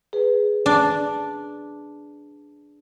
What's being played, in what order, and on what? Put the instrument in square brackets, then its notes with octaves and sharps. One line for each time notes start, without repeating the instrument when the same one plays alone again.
[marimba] G#4 B4
[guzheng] D4 [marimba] A5